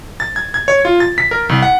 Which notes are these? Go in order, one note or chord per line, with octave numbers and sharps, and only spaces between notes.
A6
G#6
G#6
C#5
F4
A6
B6
A#4
C2
F#5